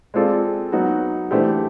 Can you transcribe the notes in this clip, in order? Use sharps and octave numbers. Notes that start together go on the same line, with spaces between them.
G#3 C4 F4 A4 D5
F#3 B3 D#4 F#4
E3 A3 D4 G4 C5